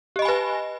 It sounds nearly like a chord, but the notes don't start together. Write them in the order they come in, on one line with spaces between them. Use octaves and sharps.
G4 D#5 B5 G#5 B4